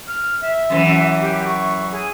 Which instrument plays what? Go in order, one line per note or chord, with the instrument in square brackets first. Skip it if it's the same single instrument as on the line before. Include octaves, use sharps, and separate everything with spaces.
[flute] F6
E5
[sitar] F#2 C#3 E3
[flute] G4
C#6
G#4